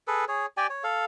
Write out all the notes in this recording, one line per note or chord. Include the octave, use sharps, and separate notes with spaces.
G#4 A4 B4
G#4 C#5
G4 D5 G5 G#5
C#5
A4 F5